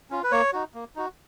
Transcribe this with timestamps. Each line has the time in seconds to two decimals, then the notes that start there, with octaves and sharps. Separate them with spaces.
0.10 C#4 F4
0.24 B4
0.32 A#3 C#5
0.53 D#4 F#4
0.74 A#3
0.96 D#4 F#4